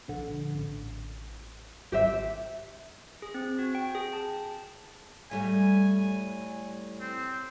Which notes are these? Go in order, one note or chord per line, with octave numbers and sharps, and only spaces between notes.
A#1 D3
A1
G#1 G4 C5 E5
G#4
C4
F#4
G5
G#4
A5
A2 G3 A3 G#5
C4